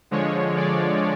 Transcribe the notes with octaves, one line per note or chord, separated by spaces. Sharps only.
D3 F3 G#3 C#5
D5